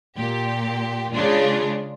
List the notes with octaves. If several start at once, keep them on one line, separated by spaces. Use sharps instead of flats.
A#2 G4
C#3 G#3 D4 F4